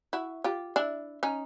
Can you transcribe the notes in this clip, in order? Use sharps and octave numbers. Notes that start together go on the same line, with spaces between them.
E4 F#4
F4 G4
D4 E4
C#4 D#4